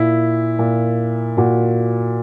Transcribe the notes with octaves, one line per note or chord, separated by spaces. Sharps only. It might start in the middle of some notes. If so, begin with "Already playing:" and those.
Already playing: A#2 E4
A#2
A#2 F#4